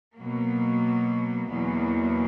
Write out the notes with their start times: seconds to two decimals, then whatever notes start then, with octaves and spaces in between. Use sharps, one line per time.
0.15 B2 F#3 A#3
1.49 E2 B2 F#3 A#3